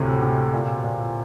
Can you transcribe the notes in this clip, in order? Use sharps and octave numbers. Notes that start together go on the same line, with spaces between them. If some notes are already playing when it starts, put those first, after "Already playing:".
Already playing: D2 A2 C3
C3
A#2
A#2